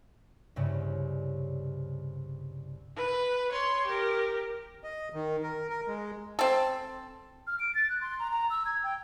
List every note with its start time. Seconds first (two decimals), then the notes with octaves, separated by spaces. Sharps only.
0.56 C2 G2 C#3
2.96 B4
3.52 C#5 C6
3.86 G4 A#4
4.84 D#5
5.14 D#3
5.43 A#4
5.70 A#4
5.88 G#3
6.39 C4 A4
7.47 F6
7.60 D7
7.75 A6
7.89 F#6
8.01 C6
8.19 A#5
8.31 A#5
8.50 E6
8.66 G#6
8.84 G5